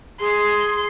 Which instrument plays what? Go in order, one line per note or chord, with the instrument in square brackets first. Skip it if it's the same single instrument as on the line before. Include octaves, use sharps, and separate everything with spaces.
[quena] G#4 [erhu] C6